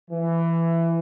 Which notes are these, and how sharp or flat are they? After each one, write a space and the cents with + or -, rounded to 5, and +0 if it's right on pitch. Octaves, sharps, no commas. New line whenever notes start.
E3 +15